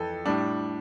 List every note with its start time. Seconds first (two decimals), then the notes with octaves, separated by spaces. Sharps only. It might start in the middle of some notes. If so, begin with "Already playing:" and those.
Already playing: F2 E3 A4
0.26 A2 G3 D4